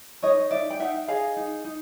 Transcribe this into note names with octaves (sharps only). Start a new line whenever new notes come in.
D#4 C#5 D#5
D#4 D5 E5
G5
D#4 E5 F#5
G#4 D#5 F5
D#4
D#4